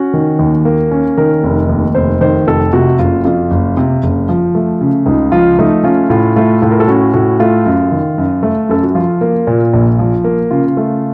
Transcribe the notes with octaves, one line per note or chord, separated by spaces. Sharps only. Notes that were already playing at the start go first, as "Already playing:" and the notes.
Already playing: C#4 F#4
D#3
D#2
A#3
C#4
D#3 A#4
F1
D#2
F1 C5
D#3 C5
F1 A4
C3 F#4
F#1 F4
F2 F4
F#1
C3
F#1
F3
A3
C#3
C#2 D#4
F3 F4
A3 D#4
C#4 F4
A2 F4
A3 F4
A2 F4
A#4
A4
C#4 F#4
A2 F#4
A3 F4
F#2
D#3
F#2
A3
F#2 A4
F#4
F3 F4
A#3
A#2
A#1
F3
A#3
C#3 F4
A3